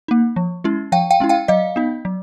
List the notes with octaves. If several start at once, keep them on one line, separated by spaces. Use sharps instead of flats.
A#3 D#4
F3
G#3 C#4 E4
F3 F5 G5
F5 G5
G#3 C#4 E4
F5 G5
F#3 D#5 F5
B3 D#4
F#3